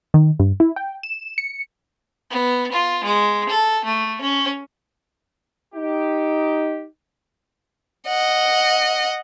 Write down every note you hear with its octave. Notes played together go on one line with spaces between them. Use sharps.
D#3
G2
E4
G5
E7
C#7
B3
F4
G#3
A4
A3
C#4
D#4 G4
D#5 F#5